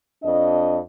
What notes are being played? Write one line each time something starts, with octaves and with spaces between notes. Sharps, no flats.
F2 D4 D#5